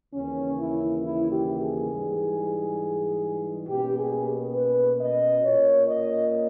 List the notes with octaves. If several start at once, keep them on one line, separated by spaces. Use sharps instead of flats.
D#2 C#3 E3 A#3 C#4
E4
E4
G4
G#4
G#2 E3 G3
B2 A#3 C#4 G4
G#4
B4
D#5
A#2 A#3 C#4 C#5
D#5